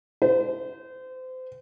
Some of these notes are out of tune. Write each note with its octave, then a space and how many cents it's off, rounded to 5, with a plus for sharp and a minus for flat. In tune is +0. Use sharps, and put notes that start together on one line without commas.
C5 -30